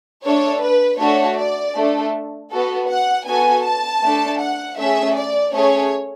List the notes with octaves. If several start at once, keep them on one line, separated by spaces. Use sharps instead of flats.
A3 D4 A4 C#5
B4
A3 D4 F#4 A4 C#5
D5
A3 D4 A4
B3 F#4 A4
F#5
B3 F#4 A4 G#5
A5
A3 D4 A4
F#5
A3 C#4 G#4 E5
D5
A3 C#4 G#4 C#5